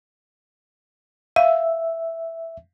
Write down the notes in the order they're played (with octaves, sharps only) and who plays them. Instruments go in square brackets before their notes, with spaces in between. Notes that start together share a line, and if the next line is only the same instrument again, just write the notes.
[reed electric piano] E5 [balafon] F5